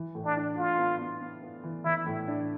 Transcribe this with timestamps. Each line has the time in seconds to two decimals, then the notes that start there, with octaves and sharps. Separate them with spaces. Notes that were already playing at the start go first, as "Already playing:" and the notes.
Already playing: E3
0.15 A2
0.25 D4
0.37 D4
0.57 A2 F4
0.78 B3
1.01 B3
1.21 B3
1.43 B3
1.64 E3
1.85 E3 E4
2.06 A2
2.28 D4